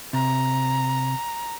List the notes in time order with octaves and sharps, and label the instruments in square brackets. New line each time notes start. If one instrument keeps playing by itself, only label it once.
[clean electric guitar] C3 [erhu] A#5